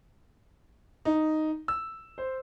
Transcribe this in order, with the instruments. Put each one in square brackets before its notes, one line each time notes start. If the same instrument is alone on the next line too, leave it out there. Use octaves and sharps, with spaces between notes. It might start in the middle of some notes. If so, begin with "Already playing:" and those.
[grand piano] D#4
E6
C5